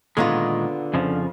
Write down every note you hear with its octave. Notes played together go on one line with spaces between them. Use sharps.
A#2 D3 D#3 G#3 B3 F4
F2 C#3 F3